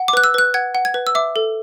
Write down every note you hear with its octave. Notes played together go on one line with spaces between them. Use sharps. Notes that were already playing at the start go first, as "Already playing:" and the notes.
Already playing: F#5
D6
B4 F#6
E6
B4 F#6
F#5 G#6
F#5
G#6
B4
E6
E5 D6
A4